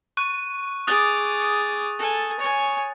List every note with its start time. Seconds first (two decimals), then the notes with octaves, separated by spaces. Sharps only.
0.17 C#6 F#6 D#7
0.87 G#4 D6 D#6 F#6 A6
1.98 A4 G#5
2.39 C#5 G#5